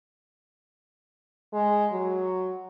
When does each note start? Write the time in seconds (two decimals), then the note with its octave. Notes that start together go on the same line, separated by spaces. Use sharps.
1.53 G#3
1.92 F#3